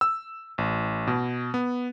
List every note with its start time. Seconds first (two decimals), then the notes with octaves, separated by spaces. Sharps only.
0.01 E6
0.58 A1
1.07 B2
1.54 B3